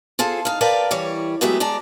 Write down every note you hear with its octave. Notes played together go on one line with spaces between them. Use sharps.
F4 G#4 A4 C5
D#4 F5
A#4 B4 D5 F5 G5 A5
E3 G3 C#5
F#3 G#3 A3 B3 G4 E5
G#3 D5 A5 A#5